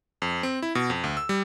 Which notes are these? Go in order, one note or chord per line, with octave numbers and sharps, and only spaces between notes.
F2
C4
E4
B2
F2
D2
E6
G3